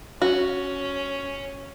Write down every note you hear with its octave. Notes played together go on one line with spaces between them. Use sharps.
C#4 F#4